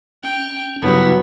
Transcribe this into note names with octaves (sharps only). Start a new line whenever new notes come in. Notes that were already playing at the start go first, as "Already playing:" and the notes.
C#4 G5
G2 C#3 F#3 B3 E4